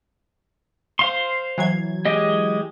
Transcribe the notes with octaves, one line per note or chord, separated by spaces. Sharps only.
C5 F5 C6
E3 F#3 G#6
G#3 G4 D#5